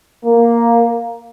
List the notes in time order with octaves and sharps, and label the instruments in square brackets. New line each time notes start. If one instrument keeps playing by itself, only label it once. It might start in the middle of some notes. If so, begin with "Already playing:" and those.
[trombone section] A#3